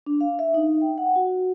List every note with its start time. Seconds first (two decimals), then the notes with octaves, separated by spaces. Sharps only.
0.06 D4
0.21 F5
0.39 E5
0.54 D#4
0.81 G5
0.98 F#5
1.16 F#4